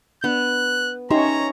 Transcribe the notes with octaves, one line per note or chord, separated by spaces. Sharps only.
B3 D4 F#6
C#4 D#4 G4 C#5 E5 A#5 C6